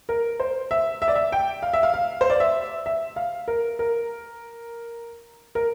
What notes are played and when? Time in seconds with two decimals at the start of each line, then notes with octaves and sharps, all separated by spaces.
0.09 A#4
0.40 C5
0.71 E5
1.02 E5
1.08 D5
1.15 E5
1.32 G5
1.63 F5
1.73 E5
1.83 F5
1.94 F5
2.21 C5
2.30 D5
2.40 E5
2.86 E5
3.16 F5
3.48 A#4
3.79 A#4
5.55 A#4